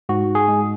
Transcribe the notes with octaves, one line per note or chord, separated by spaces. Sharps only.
G#2 F#4
G#4
G#3